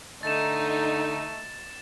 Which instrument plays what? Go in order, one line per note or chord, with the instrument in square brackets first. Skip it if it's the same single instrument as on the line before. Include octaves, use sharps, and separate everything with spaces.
[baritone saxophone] D3 [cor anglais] A3 [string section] D#4 [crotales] A6 E7